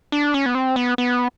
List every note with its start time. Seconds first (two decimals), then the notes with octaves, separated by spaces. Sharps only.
0.12 D4
0.34 C#4
0.46 B3
0.55 C4
0.76 B3
0.98 B3